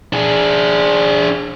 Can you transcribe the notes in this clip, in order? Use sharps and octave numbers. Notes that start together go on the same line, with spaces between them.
D4 G#4